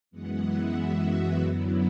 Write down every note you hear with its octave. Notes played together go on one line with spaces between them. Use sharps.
F#2 E3 G#3 B3 F#5
E5
F#4
F#2 D3 F#3 B3 E4